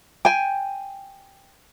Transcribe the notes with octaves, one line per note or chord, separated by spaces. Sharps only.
G5 G#5